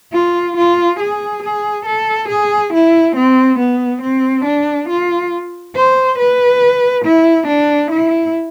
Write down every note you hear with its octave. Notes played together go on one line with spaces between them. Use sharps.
F4
F4
G#4
G#4
A4
G#4
E4
C4
B3
C4
D4
F4
C5
B4
E4
D4
E4